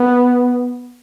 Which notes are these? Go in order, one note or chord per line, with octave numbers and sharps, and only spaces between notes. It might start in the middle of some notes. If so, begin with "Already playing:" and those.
Already playing: B3